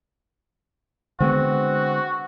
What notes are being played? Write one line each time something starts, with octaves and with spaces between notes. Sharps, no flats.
D3 G#3 B3 C4 F#4